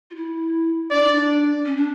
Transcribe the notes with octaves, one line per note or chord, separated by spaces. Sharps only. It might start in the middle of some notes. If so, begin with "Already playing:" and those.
F4
E4
D4 D5
D#4
D4
C#4
D4